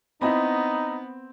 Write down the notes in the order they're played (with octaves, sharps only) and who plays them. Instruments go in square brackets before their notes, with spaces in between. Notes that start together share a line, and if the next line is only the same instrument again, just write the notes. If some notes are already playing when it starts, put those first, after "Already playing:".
[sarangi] B3 [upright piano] C4 [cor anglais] D#4 [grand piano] E4 D#5 B5